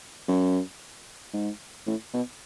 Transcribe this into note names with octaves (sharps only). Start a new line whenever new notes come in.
F#2
G#2
A2
B2